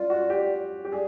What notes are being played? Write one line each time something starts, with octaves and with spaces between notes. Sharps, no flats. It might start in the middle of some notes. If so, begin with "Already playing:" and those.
Already playing: F4 D5
F#4
G4
G4
G#4 D5